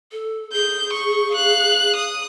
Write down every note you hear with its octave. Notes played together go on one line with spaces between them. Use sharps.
A4
G#4 G6
C#6
F5 F#6
D#6